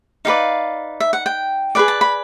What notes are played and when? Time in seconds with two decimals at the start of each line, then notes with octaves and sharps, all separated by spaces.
0.25 D#4 G4 B4 D5 F5
1.00 E5
1.13 F#5
1.26 G5
1.75 G#4 B4 D5 G#5
1.88 A5
2.01 B5